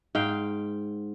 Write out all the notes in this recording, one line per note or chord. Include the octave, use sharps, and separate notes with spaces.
G#2 F5 G5